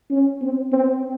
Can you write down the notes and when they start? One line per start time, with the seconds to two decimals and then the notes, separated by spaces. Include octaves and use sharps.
0.10 C#4
0.42 C4
0.72 C4